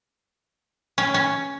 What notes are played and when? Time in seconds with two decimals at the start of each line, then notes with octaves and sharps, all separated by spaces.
0.98 C#4
1.14 C#4